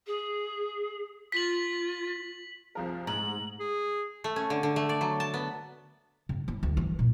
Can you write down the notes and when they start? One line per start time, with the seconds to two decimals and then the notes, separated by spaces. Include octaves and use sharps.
0.06 G#4
1.32 F4 B6 F#7
2.75 C2 F3 G#4 A#4
3.07 G#2 A#5 F#7
3.59 G#4
4.24 A3
4.36 C#4
4.50 D3
4.63 D3
4.76 A3
4.89 D5
5.01 F#3
5.20 A5
5.34 B3
6.29 C#3
6.48 E4
6.63 D2
6.77 E3
6.99 A#2